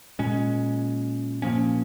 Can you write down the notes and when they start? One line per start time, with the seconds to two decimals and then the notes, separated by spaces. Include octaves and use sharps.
0.19 A#2 G#3 C#4
1.42 A#2 F3 A#3 C#4